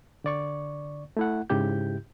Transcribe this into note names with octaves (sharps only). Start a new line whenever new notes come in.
D3 D5 C#6
A3 E4 F#5
G#2 C#3 E4 G4 G6